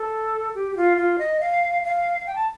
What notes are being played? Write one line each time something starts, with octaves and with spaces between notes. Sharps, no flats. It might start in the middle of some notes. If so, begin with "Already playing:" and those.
Already playing: A4
G4
G4
F4
F4
D#5
F5
F5
G5
A5